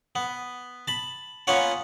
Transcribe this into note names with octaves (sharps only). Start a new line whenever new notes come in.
B3
A5 B5
A#3 B3 C#4 F4 C#5 F#5